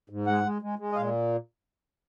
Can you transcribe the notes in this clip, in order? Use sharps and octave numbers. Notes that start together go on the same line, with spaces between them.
G#2
G#3 F#5
G#3
G#3
G#3
D#5
A#2 F5